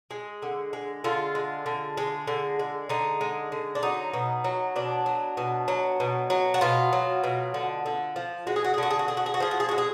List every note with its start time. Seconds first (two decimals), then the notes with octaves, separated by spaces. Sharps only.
0.11 G#3
0.42 D3
0.73 G#3
1.04 D3 F4
1.35 G#3
1.66 D3
1.97 G#3
2.27 D3
2.59 G#3
2.89 D3 D#4
3.21 G#3
3.52 D3
3.75 D4
3.83 F#3 D#4
4.13 B2
4.44 F#3
4.76 B2 D4
5.06 F#3
5.37 B2
5.68 F#3
6.00 B2
6.30 F#3
6.54 F#4
6.61 B2 F4
6.93 F#3
7.24 B2
7.54 D3
7.86 D3
8.16 F3
8.47 G#3 F#4
8.56 G#4
8.64 F#4
8.74 G#4
8.78 D3 F#4
8.91 G#4
8.99 F#4
9.08 D3 G#4
9.17 F#4
9.26 G#4
9.34 F#4
9.40 F3 G#4
9.51 F#4
9.60 G#4
9.69 G#3 F#4
9.78 G#4